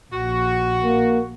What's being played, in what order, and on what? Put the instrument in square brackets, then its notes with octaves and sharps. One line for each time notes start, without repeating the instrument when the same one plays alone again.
[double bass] A#1 [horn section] F#4
[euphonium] A#3